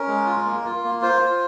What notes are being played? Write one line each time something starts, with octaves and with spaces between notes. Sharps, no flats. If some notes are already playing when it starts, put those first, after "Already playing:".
Already playing: C#4 A#4
G#3
F4
A#3
F4
A#3
F4 C5
F4